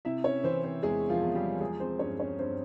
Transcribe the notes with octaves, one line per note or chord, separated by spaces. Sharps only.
C3 E4 E5
C#4 C#5
E3 C4 C5
C4 C5
E2 G#3 G#4
F3 F4
E2
G3 G4
F3 G#3 G#4
C4 C5
G2 C#4 C#5
C#4 C#5
G2 C4 C5